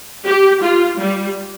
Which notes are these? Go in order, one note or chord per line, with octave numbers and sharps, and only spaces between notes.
G4
F4
G3